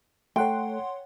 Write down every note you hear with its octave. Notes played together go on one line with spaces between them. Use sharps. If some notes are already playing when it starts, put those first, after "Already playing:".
A3 A4 C#5 F#5 G5 C6